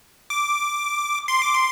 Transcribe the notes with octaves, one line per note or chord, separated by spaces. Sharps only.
D6
C6
D6
C6